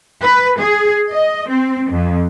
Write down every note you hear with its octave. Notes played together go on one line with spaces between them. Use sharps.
B4
G#4
D#5
C4
F2